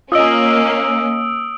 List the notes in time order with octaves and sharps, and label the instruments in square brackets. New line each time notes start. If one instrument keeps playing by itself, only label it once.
[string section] A#3 C#4 [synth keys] F4 D#5 [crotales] D#6 E6 D7